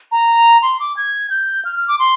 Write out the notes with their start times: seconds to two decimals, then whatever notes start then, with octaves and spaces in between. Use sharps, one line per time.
0.12 A#5
0.62 C6
0.80 D6
0.97 G#6
1.30 G6
1.65 F6
1.77 F6
1.88 D6
1.99 C6